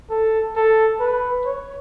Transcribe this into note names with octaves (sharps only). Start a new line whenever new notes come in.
A4
A4
B4
C#5